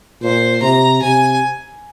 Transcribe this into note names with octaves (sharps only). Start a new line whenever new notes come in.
A#2 C5
C3 A#5
C3 G#5